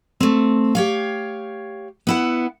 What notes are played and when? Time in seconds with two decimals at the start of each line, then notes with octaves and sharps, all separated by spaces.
0.20 A3 C4
0.75 G4 C#5 F5
2.07 B3 E4 F#5